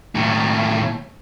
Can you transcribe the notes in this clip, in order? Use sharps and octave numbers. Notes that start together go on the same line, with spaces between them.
D#2 A2